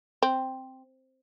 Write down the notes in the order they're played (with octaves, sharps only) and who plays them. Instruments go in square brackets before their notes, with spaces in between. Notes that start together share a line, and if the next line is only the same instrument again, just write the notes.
[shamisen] C4